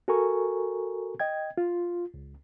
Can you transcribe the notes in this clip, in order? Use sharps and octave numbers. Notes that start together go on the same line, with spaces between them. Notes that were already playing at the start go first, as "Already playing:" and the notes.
F#4 A4 A#4 G#5 A#5 C#6
D#5 G5 G#6
F4
C#2